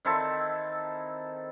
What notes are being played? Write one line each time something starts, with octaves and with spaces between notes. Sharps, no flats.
D#3 C4 E4 A4